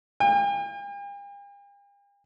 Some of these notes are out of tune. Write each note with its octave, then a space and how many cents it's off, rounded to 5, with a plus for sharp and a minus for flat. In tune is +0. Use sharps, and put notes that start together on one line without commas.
G5 +45